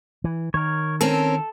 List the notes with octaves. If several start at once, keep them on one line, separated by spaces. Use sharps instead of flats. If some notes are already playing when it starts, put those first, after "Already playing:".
E3
D#3 A#4 C#5
C4 C#4 A4 A#4 A5